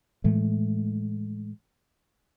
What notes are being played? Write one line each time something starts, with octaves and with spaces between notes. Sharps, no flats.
A2 E3 G#3 A3